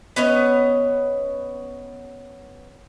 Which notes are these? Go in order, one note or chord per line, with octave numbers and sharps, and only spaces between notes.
B3 C#4 C#5 D#5